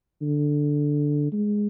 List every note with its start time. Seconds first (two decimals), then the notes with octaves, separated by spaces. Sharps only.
0.21 D3
1.32 G#3